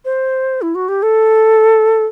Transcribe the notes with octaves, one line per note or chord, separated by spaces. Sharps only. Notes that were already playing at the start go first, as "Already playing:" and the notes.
C5
E4
F#4
G4
A4